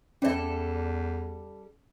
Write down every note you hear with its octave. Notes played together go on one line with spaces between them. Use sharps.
E2 G3 C#4 A4 D5 E5